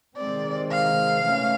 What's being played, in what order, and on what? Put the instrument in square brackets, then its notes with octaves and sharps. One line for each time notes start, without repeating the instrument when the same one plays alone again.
[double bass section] C3 D#3 G#3 C4 [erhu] D5
[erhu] F5
[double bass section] E3 A3 C#4